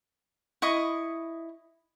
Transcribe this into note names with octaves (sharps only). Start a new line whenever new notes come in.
E4 D#5 C#6 D#6